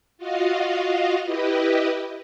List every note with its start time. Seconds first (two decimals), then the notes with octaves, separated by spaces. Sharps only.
0.18 F4 F#4 D#5 F5
1.25 E4 G4 B4 D#5